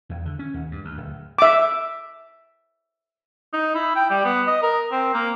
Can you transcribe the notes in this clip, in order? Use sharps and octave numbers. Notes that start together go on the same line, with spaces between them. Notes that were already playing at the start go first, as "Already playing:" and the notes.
E2
D3
C#4
D#2
G2
D2
D1
E5 D6
D#4
E4
G5
G3
B3
D#5
A#4
C4
A#3